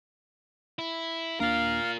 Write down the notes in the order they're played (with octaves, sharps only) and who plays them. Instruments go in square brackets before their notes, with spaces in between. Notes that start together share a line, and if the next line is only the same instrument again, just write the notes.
[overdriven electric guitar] E4
[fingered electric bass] D#2 A#3 D4 [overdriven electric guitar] F4 A#4 [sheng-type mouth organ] F5